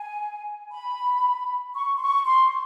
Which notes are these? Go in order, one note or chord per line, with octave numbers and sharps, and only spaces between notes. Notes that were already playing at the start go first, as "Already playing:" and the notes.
Already playing: G#5
B5
C#6
C6
C#6
C6